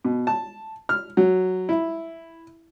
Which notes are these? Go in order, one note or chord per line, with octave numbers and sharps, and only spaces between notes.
B2
A5
F6
F#3
E4